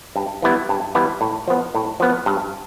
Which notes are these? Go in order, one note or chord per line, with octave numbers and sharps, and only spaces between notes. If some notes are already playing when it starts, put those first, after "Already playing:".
G2
E3 G3 B3 E4
G2
E3 G3 B3 E4
A2
F3 B3
A2
F3 B3
G2